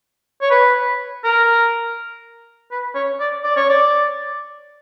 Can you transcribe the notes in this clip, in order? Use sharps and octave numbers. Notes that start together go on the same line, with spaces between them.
C#5
B4
A#4
B4
C#5
D5
D5
C#5
D5